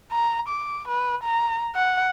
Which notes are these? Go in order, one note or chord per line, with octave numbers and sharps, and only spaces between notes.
A#5
D6
B4
A#5
F#5